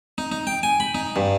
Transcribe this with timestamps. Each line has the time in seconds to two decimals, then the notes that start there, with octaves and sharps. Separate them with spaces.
0.18 D#4
0.32 D#4
0.47 G5
0.63 G#5
0.80 B5
0.95 D#4
1.16 G2